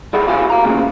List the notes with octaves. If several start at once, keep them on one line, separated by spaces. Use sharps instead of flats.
G3 E4 G#4 F#5
E4 F#4 G4 F5 G#5
F5 A#5
D2 A#2 C#3 G#3